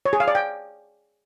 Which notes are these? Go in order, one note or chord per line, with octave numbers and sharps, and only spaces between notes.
C#5
G#4
F5
D5
G5